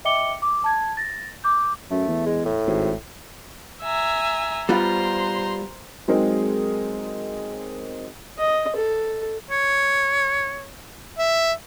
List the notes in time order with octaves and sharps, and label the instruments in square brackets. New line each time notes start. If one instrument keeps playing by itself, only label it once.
[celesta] D#5 E5 G5 D6 C#7 G7
D6
A5 G#6
A6 A#6
D6 G6
[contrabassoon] F#2 [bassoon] A3
[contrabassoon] E2
[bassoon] G#3
A2
[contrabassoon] G#1
[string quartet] E5 G#5 A#5
[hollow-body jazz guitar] G3 B3 F4 [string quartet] C5 A#5 C6
[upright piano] F#3 G#3 C4 D#4 G#4 A#4
[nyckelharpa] D#5
A4
[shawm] C#5
E5